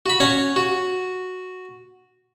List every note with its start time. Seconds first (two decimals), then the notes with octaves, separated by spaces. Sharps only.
0.06 F#4 B5
0.20 C#4 C#5 F#5 A#5
0.56 F#4